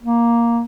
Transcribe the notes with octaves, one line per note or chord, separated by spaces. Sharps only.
A#3